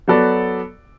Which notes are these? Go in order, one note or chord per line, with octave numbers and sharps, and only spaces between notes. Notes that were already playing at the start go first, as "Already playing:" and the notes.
F#3 B3 F#4 A4 D5